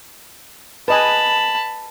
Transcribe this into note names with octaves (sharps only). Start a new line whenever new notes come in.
B4 D#5 G#5 A5 B5